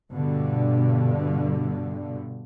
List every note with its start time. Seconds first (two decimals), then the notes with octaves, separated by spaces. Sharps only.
0.12 G2 B2 D3